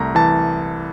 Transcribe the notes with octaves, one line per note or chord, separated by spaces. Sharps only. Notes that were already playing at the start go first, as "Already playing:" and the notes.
Already playing: C2 A3 A#5
E3 A5